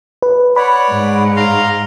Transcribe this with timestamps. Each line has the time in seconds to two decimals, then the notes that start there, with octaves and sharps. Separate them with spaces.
0.22 B4
0.56 C#5 D5 F#5 B5
0.90 G#2
1.36 F5 A#5 C6